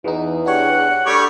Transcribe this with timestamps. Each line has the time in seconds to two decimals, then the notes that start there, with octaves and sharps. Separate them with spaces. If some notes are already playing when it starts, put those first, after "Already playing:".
0.04 E2 E3 D#4
0.46 D4 G4 C#5 F#5
1.06 D3 G3 A3 C#5 D6